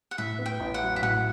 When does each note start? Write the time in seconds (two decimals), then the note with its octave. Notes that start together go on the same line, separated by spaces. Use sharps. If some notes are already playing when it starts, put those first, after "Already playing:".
0.11 F#5
0.18 A2 E5
0.39 B3
0.46 G5
0.60 A1
0.74 F#5
0.82 F#3
0.96 E5
1.02 A2 F#5